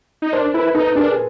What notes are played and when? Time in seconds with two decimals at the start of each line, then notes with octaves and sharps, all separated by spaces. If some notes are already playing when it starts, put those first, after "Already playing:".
0.22 D#4
0.32 D4 A#4 C5
0.54 E4 A4 B4
0.75 D#4 A4 B4
0.95 D4 G#4 A#4
1.12 G#4